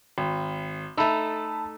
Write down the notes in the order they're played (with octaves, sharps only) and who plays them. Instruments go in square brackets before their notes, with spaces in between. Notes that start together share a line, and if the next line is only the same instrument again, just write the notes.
[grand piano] G#1
[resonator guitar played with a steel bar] A3 D#4 [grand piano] A5 B5 E6